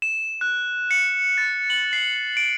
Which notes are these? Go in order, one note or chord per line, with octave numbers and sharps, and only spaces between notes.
E7
F#6
C#7
A6
F#7
C7
D7